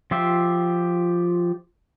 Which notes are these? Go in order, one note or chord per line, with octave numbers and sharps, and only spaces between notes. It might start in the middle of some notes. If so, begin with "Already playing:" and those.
F3 F4 G4 E5